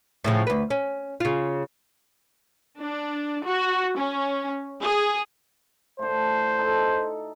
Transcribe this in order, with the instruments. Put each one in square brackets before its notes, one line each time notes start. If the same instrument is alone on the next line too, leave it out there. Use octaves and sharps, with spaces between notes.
[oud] A2 C#3 F3
D2 B4
C#4
C#3 F4
[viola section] D4
F#4
C#4
G#4
[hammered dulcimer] A2 D3 [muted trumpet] C5
[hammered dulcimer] D#4 F#4 A4